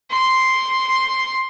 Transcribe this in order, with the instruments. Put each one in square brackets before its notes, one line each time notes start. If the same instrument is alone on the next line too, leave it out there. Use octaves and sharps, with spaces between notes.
[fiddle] C6